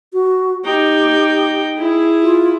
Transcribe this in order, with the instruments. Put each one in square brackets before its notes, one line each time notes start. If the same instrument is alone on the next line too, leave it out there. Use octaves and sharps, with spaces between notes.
[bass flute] F#4
[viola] D#4 G5 [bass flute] G4
[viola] E4 G#4
[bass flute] F4